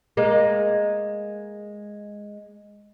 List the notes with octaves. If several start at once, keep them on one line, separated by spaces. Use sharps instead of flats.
G#3 A#3